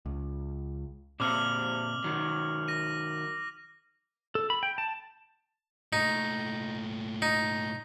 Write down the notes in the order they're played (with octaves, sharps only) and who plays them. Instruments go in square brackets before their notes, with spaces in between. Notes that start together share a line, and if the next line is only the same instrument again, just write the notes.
[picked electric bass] C#2
[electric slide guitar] A#2 C4 C5 [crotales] D6 F6 F#7
[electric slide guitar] D#3 F#3
[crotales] A#6 D#7
[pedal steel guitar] A4
B5
G5
A5
[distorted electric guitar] A#2 A3 [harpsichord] D#4
[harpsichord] D#4